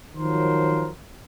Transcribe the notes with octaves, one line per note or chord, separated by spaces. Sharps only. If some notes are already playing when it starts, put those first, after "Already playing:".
D#3 F3 F#3 A#4 C5